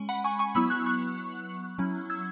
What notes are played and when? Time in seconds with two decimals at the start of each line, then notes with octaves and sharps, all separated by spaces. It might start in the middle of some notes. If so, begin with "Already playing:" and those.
Already playing: G#3 C#4
0.09 F#5 B5
0.24 G#5 C#6
0.39 G#5 C#6
0.55 F#3 B3 E4 B5 E6
0.70 C#6 F#6
0.86 C#6 F#6
1.78 F#3 C#4 E4
2.10 E6 G#6